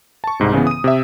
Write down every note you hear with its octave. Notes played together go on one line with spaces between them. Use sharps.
A5 C#6
C2 G#2 C3
C#3 E3 B3
D#6 D#7
C3 E5